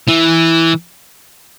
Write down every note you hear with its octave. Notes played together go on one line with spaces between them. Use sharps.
E3